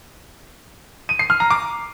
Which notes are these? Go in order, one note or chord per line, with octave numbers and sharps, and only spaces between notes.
D#7
C7
F6
A#5
D6